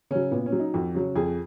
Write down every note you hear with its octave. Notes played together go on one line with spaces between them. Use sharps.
C#3 F#3 C#4
A#2 B3
C#4
F#3
D#4
F2 F#4
C#3 F#3
F2 G#4